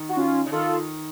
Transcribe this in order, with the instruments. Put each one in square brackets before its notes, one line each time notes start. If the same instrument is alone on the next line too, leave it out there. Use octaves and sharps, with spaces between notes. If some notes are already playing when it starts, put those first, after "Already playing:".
Already playing: [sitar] D#3
[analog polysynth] F#4
C#4 F4
[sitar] C#3
[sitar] D#3 [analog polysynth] F4 A4